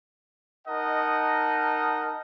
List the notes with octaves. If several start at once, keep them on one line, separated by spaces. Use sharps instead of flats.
D#4 A#4 D#5 F#5 A5